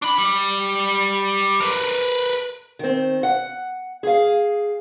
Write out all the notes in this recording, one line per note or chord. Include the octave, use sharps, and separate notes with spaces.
D4 B5
G3
A#4 B4
D#3 C4
F#5
G#4 F5